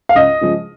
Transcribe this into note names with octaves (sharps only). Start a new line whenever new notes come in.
F5
C#2 D#5
C#3 F3 G#3